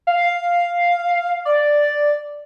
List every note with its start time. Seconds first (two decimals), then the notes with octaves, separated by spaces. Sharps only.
0.07 F5
1.45 D5